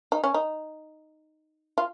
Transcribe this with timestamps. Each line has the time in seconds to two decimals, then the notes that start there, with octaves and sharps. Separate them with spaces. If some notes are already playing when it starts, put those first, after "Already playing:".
0.12 D#4
0.24 C#4
0.34 D#4
1.78 F4